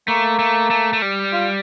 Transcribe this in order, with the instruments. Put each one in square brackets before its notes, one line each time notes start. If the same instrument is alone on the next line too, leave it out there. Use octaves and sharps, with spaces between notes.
[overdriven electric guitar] A3 [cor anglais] A#3
[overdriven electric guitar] A3
A3
A3
G3
[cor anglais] F4